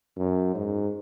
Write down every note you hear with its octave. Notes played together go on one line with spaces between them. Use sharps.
F#2
G#2